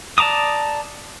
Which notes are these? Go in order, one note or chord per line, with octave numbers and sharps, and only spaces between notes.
D5 A5 A#5 D6 D#6